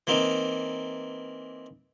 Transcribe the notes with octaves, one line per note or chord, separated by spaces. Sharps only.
E3 A#3 C4 D#4